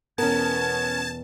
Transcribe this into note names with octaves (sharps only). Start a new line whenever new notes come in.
E2 B2 B3 C#4 A#4 A5 G#6